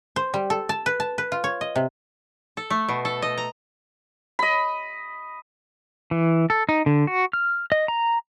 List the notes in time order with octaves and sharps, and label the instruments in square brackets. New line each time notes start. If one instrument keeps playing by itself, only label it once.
[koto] C5
G3
A4
A5
B4
A5
B4
F4
C#5
D#5
C3
A4
A3
B2
A4
D#5
A#5
[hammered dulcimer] D#5 B5
[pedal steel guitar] E3
A4
D#4
D3
F#4
F6
D#5
A#5